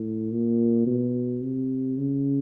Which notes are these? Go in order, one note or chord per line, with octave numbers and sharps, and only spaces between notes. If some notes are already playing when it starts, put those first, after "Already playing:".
Already playing: A2
A#2
B2
C3
C#3